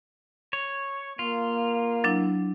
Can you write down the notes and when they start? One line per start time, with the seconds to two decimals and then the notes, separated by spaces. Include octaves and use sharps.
0.53 C#5
1.19 A#3 F4
2.04 F#3 D4 E4